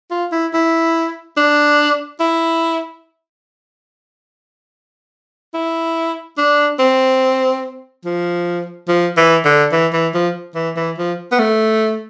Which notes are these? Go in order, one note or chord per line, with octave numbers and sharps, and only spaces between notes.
F4
E4
E4
D4
E4
E4
D4
C4
F3
F3
E3
D3
E3
E3
F3
E3
E3
F3
B3
A3